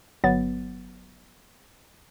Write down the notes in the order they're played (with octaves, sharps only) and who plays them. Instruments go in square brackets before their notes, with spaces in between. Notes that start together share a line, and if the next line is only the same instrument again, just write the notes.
[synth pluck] G1 F#3 B3 A6